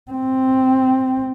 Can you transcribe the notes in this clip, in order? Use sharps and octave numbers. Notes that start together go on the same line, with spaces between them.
C4